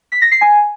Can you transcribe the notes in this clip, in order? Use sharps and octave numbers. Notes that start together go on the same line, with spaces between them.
B6
A#6
C7
G#5